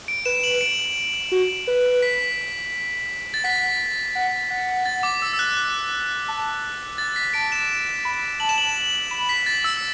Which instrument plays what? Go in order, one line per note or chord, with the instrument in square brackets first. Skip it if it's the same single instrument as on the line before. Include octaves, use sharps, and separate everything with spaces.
[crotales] D7
[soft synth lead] B4 [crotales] E7
[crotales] F#7
E7
D7
[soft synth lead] F#4
B4
[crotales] B6
A6
[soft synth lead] F#5 [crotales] B6
[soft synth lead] F#5
F#5
[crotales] A6
D6
E6
E6
F#6
F#6
[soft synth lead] A5
[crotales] A6
B6
[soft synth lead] A5 [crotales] D7
[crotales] E7
[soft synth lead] B5
[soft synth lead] A5 [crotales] F#7
[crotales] E7
F#7
[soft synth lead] B5 [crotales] E7
[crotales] B6
A6
E6
E6